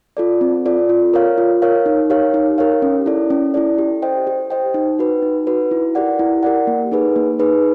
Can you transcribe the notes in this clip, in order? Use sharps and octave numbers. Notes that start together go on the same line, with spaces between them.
F4 A4 D5
C4
F4 A4 D5
F4
A#4 C#5 F5
F4
A#4 C#5 F5
D#4
G4 A#4 C#5 F5
D#4
G4 A#4 C#5 F5
C#4
E4 A4 D5
C#4
E4 A4 D5
G4
C5 D#5 G5
G4
C5 D#5 G5
D#4
F#4 B4
D#4
F#4 B4
E4
G4 A#4 D5 F#5
E4
G4 A#4 D5 F#5
A#3
D#4 G#4 B4
A#3
D#4 G#4 B4